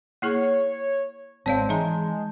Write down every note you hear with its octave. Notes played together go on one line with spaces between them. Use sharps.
A#3 E4 G#4 C#5
G#1 G#3 C4 C#5 D5 F5 A5 G6
E3 G#3 D#4 E5 A#5